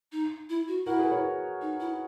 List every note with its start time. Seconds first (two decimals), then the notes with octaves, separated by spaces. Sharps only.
0.12 D#4
0.49 E4
0.68 F#4
0.86 E4 F#4 A#4
0.99 G#4 B4
1.11 A#4 C#5
1.61 D#4
1.80 E4